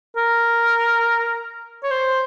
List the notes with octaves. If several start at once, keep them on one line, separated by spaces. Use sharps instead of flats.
A#4
C#5
C5